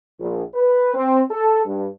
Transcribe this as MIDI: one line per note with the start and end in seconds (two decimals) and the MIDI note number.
0.19 0.41 34
0.53 0.91 71
0.94 1.21 60
1.29 1.61 69
1.65 1.86 43